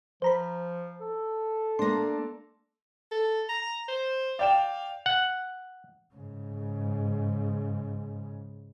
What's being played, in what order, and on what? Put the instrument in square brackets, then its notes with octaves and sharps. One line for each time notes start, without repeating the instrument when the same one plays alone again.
[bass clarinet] F3 [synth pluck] C5 A#5 B5
[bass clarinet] A4
[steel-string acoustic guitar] A#3 D4 [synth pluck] C6 A#6
[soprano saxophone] A4
A#5
C5
[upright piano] D5 G5 E7 [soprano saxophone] F5
[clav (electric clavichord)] F#5
[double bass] G#2 C#3